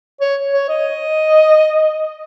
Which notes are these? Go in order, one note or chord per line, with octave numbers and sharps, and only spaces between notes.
C#5
C#5
D#5